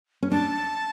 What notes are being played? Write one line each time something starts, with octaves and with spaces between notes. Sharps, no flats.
C#4
D4 A5